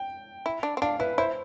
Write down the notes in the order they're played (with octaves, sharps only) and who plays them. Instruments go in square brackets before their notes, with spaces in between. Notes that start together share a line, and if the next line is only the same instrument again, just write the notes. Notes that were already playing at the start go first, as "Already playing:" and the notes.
Already playing: [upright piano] G5
[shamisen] E4
D4
C4
[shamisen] D4 [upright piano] F5
[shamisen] E4 [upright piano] B4
[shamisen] E4 [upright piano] C5